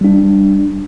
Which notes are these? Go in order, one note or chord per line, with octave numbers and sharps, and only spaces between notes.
G3 D4